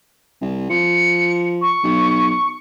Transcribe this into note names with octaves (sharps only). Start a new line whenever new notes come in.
C2
F3 C#7
C#6
B1